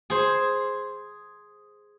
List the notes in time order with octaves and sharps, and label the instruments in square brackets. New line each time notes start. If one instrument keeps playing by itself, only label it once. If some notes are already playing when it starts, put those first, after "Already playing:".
[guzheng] G#4 C5